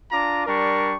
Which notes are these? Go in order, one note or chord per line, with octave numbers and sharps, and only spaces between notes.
D4 F4 A#5 D6
G3 D4 A#4 C#6